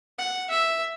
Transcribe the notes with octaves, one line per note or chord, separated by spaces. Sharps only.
F#5
E5